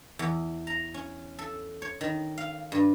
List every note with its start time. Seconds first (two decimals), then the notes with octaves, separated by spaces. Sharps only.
0.19 E2
0.67 A#5
0.94 C#4
1.39 A4
1.82 C#5
2.01 D#3
2.38 F5
2.72 G2